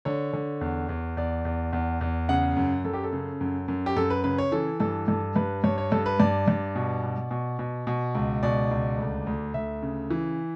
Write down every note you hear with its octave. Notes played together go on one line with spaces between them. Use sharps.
D3 C#5
D3
E2
E2
E2 D5
E2
E2
E2
C#3 F#5
F#2
F#2 A4
G4
A4
C#3
F#2
F#2
G4
F#2 A4
B4
C#3 B4
C#5
E3 A4
G2 A4
G2 A4
G2 B4
G2 C#5
C#5
G2 A4
B4
G2 D5
G2
B2
B2
B2
B2
B2
C#2
B2 D5
C#2
D2
D2
D2 E5
C#3
E3